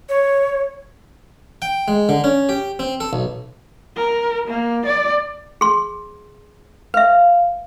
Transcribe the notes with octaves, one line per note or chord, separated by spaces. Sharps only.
C#5
G5
G#3
D3
C#4
G4
C4
A4
B1
A#4
A#3
D5
G#4 C6
B4 E5 F5